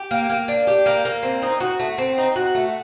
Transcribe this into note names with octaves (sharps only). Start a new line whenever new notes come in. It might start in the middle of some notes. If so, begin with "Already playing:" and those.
Already playing: G4
A#3
A#3
D4
G4
A#3
A#3
C4
D#4
F#4
A3
C4
D#4
F#4
A3